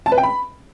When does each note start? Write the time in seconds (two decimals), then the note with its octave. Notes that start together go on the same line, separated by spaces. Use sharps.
0.06 A5
0.12 B4
0.18 G5
0.23 B5